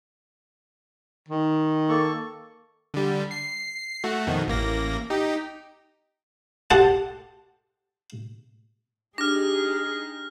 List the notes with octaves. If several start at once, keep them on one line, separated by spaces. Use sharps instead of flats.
D#3
A#3 A4 C#6
D3 G3
C7
A3 F#4
F2 B2 D#3
A1 A#3 A#6
D#4 G4
G4 A4 C5 F#5 A5
D4 D#4 G4 G#4 F6 A#6